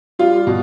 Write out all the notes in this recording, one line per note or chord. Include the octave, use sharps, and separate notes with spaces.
G3 F4
B2